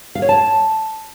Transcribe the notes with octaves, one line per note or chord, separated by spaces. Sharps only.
F5
C#5
A5